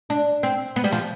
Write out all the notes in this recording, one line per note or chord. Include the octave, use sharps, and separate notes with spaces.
D4
C4
B3
G3
F3